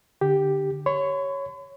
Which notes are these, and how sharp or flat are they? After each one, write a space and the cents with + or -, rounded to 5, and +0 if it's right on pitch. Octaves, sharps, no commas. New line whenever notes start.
D3 +0 G4 +0
C#5 +0 B5 +45